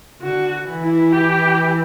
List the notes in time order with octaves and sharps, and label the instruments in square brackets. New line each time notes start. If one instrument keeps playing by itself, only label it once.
[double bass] D3 [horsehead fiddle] F#4
[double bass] E3
[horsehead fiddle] E4
G4